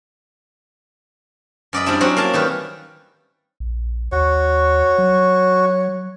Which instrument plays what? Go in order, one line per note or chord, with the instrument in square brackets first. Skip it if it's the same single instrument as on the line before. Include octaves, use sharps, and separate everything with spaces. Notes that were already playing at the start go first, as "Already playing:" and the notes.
[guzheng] F#2 D5 D#5 B5
G3 C4 D4 E4
F#3 C4 C#4 F#4
A#3 F5 A5
D#3 G3 B4
[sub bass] A#1
[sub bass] D#2 [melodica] F#4 [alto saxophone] C#5
[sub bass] F#3